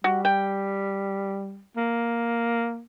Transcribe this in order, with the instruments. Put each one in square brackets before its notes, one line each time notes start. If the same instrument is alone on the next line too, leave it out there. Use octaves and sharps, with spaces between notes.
[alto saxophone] G3 [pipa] F#4
[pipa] G5
[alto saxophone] A#3